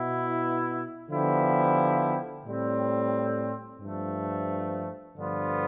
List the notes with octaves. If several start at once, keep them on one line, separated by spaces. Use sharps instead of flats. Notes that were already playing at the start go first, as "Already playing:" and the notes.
Already playing: B2 B3 E4
D3 F3 B3 E4 G4
A2 G3 C4
G2 F3 A3
G2 D3 F3 B3 F4